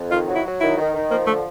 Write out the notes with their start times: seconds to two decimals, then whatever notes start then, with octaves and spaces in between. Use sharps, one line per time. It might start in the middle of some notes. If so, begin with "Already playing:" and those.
Already playing: F2
0.10 D#3 F4
0.28 F#3
0.35 E4
0.45 F#3
0.60 D#3 E4
0.77 D#3
0.94 D#3
1.10 F3 A#3
1.27 D3 A3